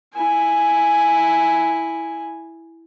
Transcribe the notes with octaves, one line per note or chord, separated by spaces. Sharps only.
E4 G#5